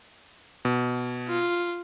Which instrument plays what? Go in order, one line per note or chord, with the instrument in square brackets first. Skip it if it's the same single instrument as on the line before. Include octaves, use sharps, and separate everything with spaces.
[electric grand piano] B2
[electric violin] F4